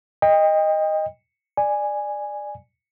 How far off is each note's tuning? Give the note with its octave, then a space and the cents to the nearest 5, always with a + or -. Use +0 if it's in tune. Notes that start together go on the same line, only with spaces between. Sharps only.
D#5 +0 G5 +30
D5 +15 G#5 -5